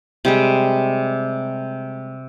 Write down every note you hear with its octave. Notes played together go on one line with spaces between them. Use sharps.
C3 G3 G#3